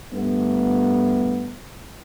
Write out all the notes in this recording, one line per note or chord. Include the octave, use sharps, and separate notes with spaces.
G2 A3 B3